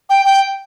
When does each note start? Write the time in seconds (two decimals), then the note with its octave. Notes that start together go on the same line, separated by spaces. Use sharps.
0.10 G5
0.26 G5